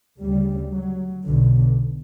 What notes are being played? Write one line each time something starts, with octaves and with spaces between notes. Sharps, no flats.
D2 C#3 G3
F#3
B1 B2 D3